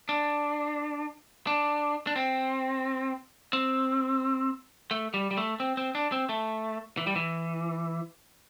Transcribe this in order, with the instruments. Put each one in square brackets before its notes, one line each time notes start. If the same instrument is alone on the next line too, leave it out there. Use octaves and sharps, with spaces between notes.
[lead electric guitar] D4
D4
D4
C4
C4
A3
G3
G3
A3
C4
C4
D4
C4
A3
E3
G3
E3